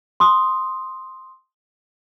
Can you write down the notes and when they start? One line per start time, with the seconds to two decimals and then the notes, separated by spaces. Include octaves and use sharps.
0.20 C6 D#6